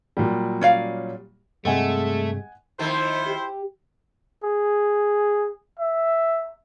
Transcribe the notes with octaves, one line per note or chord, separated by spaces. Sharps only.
A#2 F#3 G3
C#4 D5 F5
G2 C3 G#3 A3 D#5 F#5 G#5
F2 D#3 A3 E4 C5
G4
G#4
E5